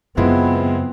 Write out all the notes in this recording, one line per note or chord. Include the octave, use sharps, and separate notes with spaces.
F#2 C#3 G#3 B3 C4 E4 F4